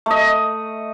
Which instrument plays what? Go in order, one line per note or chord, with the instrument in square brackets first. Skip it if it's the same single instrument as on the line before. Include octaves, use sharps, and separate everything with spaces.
[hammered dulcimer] A3 D#5